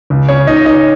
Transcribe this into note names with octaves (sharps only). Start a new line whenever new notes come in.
C#2
C#4 C#5
C#2 D#4 D#5
D#4 D#5